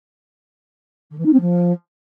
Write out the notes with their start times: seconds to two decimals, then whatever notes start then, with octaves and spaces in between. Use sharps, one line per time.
1.10 D3
1.18 E3
1.25 D#4
1.32 C4
1.40 F3